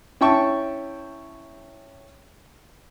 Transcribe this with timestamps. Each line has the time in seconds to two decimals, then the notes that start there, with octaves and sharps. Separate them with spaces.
0.21 C#4 E4 G5 A5 C#6